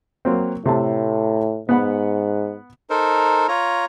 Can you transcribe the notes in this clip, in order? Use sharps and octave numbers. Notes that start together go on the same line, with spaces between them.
F#3 A#3 C4
A2 C3 A3 A5
G#2 B3 F#5 B5
D#4 A4 A#4 C5
F4 C#5 A#5